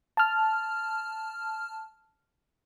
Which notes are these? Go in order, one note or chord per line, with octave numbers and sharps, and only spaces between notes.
A5 F6